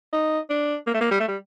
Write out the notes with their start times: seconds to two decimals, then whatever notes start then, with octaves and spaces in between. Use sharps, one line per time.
0.13 D#4
0.50 D4
0.87 A#3
0.94 A3
1.01 A#3
1.11 G3
1.20 A3
1.28 G3